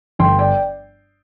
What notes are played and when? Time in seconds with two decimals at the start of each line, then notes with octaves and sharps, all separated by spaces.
0.19 G1 G5 C6
0.39 D5 G5